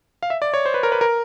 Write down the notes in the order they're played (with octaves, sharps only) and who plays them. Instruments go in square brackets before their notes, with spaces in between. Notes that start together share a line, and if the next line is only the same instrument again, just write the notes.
[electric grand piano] F5
E5
D5
C#5
C5
B4
A#4
B4
A#4